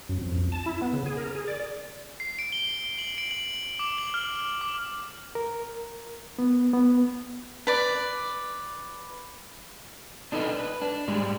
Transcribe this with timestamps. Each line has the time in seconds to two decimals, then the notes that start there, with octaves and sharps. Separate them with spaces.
0.09 F#2
0.22 F2
0.38 F2
0.52 A5
0.66 E4
0.82 B3
0.93 C#3
1.06 G#4
1.17 A#4
1.35 G#4
1.48 D5
2.20 C7
2.39 D7
2.52 G7
2.99 F#7
3.18 D7
3.31 F#7
3.79 D6
3.98 F#7
4.14 F6
4.61 D6
5.35 A#4
6.39 B3
6.73 B3
7.67 B4 D5
10.32 D4 D#4 A4 B4 D#5
10.59 B4
10.81 D4
11.08 G#2 G3 G#3